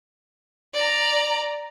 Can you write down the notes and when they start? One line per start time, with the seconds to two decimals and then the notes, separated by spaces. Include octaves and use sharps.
0.74 D5 A#5